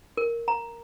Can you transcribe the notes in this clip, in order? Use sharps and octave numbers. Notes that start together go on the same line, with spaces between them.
A#4
A#5